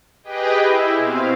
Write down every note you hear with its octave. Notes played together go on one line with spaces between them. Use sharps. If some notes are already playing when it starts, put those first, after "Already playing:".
G4 G#4 B4 D#5 G5
E4
B2 C4 F5